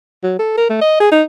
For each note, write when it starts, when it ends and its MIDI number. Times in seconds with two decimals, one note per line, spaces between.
0.24 0.34 54
0.39 0.52 69
0.58 0.66 70
0.70 0.78 57
0.81 0.97 75
1.00 1.10 68
1.12 1.23 63